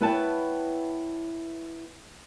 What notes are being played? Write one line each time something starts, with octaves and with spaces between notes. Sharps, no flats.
B3 E4 B4 C#5 G5 A5